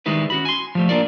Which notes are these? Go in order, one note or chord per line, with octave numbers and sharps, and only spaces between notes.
D#3 G3 G#3 D#4 E4 B4
C#4 F#4 B5
G#5 C6
F3 G3 A3
A#3 D4 F4 A#4 D5